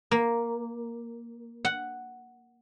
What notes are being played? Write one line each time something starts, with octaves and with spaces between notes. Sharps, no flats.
A#3
F#5